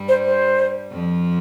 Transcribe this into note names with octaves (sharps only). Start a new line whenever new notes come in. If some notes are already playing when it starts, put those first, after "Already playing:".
Already playing: G2 G3
C5
C5
F2 F3